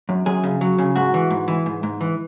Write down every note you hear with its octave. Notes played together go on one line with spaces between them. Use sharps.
F#2
F#2 G#4
C#3
F#3
C#3
G#2 F#4
E3
G#2
E3
G#2
G#2
E3